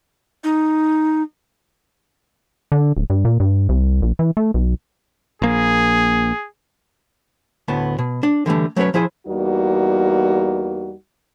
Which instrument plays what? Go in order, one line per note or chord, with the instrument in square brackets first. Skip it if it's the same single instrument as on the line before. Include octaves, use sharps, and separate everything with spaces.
[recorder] D#4
[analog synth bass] D3
D1
G2
A#2
G2
C2
A#1
E3
A3
B1
[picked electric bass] A#1 A#3 [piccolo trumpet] G#4
[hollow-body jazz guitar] D2 A2 B3 A5
B2
D4
D3 E3 G3 A3
F#3 A3 C#4 B4 C#5
F3 E4 G#4 C5 G#5
[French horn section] E2 G3 A#3 D#4 F#4